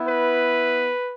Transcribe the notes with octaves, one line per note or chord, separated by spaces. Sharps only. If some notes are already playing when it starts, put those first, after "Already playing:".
Already playing: B3 E4
B4